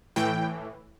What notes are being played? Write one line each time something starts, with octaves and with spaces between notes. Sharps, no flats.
A2 E3 G5